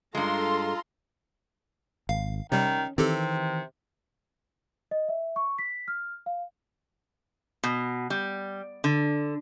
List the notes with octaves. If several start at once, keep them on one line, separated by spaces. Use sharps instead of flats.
G2 G#3 F4 A4 A#5 C6
G#1 F5
C3 D#3 G3 C#4
C3 D#3 E3 C4 G4 A4
D#5
E5
C#6
B6
F6
F5
B2
G3
D3